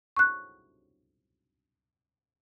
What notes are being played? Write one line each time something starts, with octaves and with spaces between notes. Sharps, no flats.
C#6 F#6